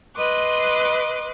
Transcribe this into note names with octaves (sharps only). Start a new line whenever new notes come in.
B4 D#5 C6 D6 F#6